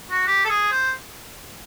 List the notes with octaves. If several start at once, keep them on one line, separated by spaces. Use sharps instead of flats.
F#4
G4
A4
G#4
C5